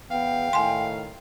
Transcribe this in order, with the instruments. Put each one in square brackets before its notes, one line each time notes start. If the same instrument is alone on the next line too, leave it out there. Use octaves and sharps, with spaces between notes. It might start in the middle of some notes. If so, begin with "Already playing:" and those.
[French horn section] E2 B3 [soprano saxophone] F5 [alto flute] G5
[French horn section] A2 D#3 [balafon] G#5 C6